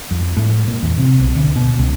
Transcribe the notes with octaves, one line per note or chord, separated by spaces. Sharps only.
F2
A2
A#2
E2
C3
B1
D2
B2
C#2